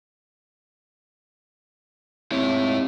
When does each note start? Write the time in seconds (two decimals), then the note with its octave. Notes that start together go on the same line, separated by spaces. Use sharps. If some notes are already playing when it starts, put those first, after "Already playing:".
2.32 D#2 C3 E4 C#5